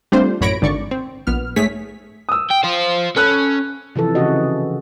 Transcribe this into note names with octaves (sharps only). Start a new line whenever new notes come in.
G3 A3 C4 D4 F4 C5
A1 F#2 C#5 B5 A#6 D7
G#1 D3 D5 C#6
C4
A#1 B3 F6
G#2 A3 G#4 C#5 B6
D#6 E6
G5
C5 F5
C#4 A4 B5 F#6
C3 E3 F3 A4
C#3 E3 C#4 F#4 D#5